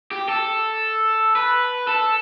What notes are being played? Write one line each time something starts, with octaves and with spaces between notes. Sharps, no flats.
G4
A4
B4
A4